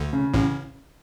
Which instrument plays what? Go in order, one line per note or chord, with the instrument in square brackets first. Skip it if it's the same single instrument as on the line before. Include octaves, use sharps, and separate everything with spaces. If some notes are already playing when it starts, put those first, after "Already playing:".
Already playing: [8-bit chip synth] D2 D3
[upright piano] C#3
[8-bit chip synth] A1 A2 [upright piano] C#3